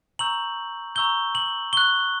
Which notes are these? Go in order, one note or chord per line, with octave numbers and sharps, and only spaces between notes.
A#5 C#6 E6 G6 F#7
A#5 C#6 E6 G6 G7
F#7
C#6 F#6 G7